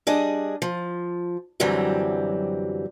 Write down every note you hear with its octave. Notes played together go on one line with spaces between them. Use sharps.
G3 D4 G#4 D#5
F3
F#2 D3 E3 F#3 G3 C4